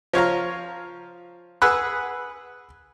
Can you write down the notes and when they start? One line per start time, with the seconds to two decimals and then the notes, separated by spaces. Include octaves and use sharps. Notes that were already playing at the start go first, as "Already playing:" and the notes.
0.13 F3 C#5 F5 A#5
1.62 G#4 B4 F#5 B5 E6 F#6